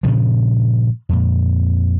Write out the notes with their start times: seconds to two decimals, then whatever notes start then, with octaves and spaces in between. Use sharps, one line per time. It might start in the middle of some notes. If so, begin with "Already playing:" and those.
0.03 G2 A#2 C#3 F3
1.09 F2 A#2